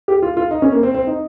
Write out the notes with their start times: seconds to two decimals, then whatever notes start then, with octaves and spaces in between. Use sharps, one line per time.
0.08 G4
0.22 F4
0.37 F4
0.51 D#4
0.62 C#4
0.72 A#3
0.83 C4
0.94 C4
1.07 D#4